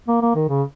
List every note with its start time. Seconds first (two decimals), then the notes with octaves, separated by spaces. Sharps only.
0.08 A#3
0.22 A#3
0.35 D#3
0.49 C#3